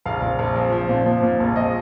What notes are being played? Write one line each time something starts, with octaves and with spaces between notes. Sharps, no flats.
A#1 F5
A#1
A#1
F3
F3
A#2
F3
A#2
A#1
F3 D#5